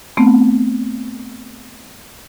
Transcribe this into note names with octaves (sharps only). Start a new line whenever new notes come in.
A3 B3 C4